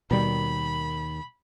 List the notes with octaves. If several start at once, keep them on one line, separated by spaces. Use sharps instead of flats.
D#2 B2 D#3 G3 B5